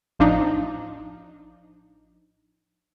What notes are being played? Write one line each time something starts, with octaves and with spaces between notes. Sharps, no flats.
A1 F3 D4 D#4